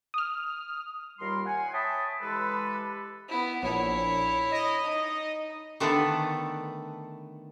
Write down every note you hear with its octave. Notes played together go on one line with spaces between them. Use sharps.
D#6 F6
D#2 G3 F4 A#4 C6
F#5 G#5
C#5 E5 G5 A5 B5 D#6
E3 G#3 G4 A4 B4
B3 E4
A#1 E4 C#5
D#5
D#4
D3 D#3 A3 B3 A4 B4